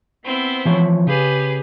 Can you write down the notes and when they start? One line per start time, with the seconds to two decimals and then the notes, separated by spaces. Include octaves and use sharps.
0.23 B3 C4 E4
0.65 E3 F3 C#5
1.07 C#3 G4 G#4 B4